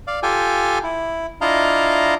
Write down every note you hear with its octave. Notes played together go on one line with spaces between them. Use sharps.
D5 F5
F4 G4 A4 G5 G#5
E4
D4 E4 F4 D#5 F5 A#5